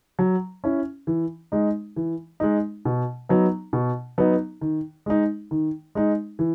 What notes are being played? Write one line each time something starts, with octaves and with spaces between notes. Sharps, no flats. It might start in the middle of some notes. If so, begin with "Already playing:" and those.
F#3
C#4 E4
E3
G#3 D#4
E3
G#3 D#4
B2
F#3 B3 D#4
B2
F#3 B3 D#4
D#3
G#3 D#4
D#3
G#3 D#4
E3